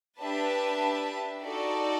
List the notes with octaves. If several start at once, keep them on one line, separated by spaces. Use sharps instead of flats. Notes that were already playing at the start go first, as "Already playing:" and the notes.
D4 G4 B4 E5 A5
D#4 F#4 A4 D5